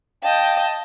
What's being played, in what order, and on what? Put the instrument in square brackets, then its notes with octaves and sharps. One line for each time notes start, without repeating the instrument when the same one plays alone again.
[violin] D#5 A5 [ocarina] F5 [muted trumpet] G5